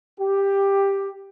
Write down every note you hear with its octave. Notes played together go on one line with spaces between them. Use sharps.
G4